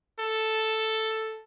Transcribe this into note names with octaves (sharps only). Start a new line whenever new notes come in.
A4